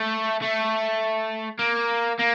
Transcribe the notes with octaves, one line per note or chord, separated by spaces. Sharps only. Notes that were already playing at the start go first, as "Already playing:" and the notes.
Already playing: A3
A3
A#3
A#3